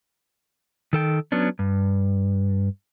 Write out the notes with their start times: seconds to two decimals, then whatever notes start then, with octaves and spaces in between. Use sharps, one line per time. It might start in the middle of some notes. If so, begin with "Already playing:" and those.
0.93 D#3 A4 G5
1.32 F#3 B3 C#4 D4
1.59 G2